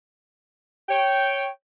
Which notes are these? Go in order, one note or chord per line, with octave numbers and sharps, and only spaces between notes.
C#5 G5